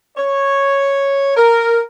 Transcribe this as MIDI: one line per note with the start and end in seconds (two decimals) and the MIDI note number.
0.17 1.32 73
1.37 1.81 70